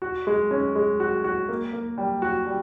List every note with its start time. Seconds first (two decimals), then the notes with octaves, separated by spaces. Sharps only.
0.02 F#4
0.27 G#3
0.51 C#4
0.75 G#3
1.00 F#4
1.24 F#4
1.49 A#3
1.73 A#3
1.98 G3
2.22 F#4
2.47 G3